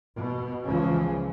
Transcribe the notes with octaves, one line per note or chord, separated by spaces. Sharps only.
B2
C#2 C#3 E3 F3